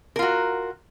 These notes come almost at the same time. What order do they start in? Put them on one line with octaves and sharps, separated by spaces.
A#4 F4 F#4